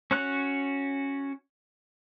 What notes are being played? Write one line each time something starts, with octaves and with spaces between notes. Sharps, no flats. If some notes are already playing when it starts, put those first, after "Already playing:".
C#4 F#4 C#5 C#6 F#6